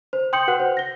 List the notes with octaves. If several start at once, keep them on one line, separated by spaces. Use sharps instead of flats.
C5
G5 C6 D#6 G6 C#7 F#7
F#4 B4 F#5 F#6
C5
A#6 G7